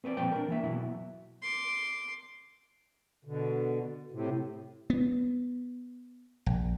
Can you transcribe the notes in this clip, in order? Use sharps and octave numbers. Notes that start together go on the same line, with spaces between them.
C4 B4 C5 D5
A#2 F3 G3 C4 B4 G5
D4 A#4
E3 A#3 E5
B2 F#3 B3 E4
C6 D6
B2 D3
A2 C3
B3
A#1